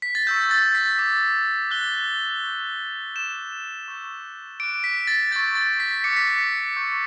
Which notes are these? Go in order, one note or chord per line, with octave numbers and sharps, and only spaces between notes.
B6
A6
C#6 E6 G6
A6
B6
D6 G6
D6 F#6 G7
C#6 E6 G6
D6 G6 E7
C#6 E6 G6
D6 F#6 D7
B6
A6
C#6 E6 G6 A6
A6
B6
D6 F#6 C#7
B6
C#7
C#6 E6 G6